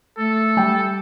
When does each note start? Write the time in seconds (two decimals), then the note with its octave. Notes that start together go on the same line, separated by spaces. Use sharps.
0.18 A3 A4
0.57 G3 G5